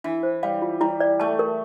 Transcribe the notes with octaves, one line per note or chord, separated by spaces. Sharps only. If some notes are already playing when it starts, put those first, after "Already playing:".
E3 D4
C5
G3 F5
F4
G3 E4
D5
A3 A5
A#4